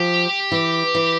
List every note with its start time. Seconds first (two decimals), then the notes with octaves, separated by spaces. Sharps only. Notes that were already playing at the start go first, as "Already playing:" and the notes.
Already playing: F3 G4
0.52 E3
0.95 E3